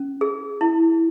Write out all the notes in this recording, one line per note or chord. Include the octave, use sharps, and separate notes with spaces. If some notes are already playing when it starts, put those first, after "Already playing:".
Already playing: C#4
G#4
E4